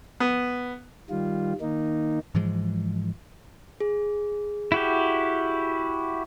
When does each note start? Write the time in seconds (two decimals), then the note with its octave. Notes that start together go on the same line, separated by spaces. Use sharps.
0.20 B3
1.10 D#3 G3 F4
1.61 D#3 A#3 D#4
2.35 G#2 E3 F3 G#3
3.80 G#4
4.72 E4 F#4 G4